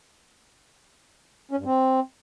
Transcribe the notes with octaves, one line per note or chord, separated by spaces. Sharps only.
C#4
G2
C4